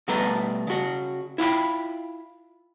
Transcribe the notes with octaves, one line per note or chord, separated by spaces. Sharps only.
B2 G3 A3 A4 B4 A#5
C#3 F#4
E4 F4 G5 B5